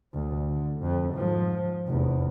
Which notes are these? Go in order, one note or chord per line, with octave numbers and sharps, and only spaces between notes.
D2
D3
F2
G#2 F3
F1 E2